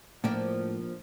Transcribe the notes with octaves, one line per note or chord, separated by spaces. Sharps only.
A2 F3 A#3 D4